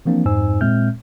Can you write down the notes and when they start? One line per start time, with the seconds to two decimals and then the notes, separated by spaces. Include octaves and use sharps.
0.05 E3 F3 A#3 C4 D4
0.25 F2 G#2 D#4 C5 G#5 E6
0.61 A#2 G#3 C4 E5 F6 G6